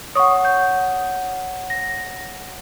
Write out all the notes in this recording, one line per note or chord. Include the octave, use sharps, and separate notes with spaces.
C#5 F#5 C#6 D#6
G6
A#6